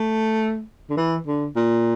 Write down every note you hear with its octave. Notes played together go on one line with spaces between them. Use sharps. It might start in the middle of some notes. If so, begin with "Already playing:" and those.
Already playing: A3
D3
E3
D3
A#2